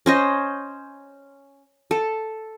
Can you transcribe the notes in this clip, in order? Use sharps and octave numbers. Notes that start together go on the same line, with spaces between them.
C#4 C5 D#5
A4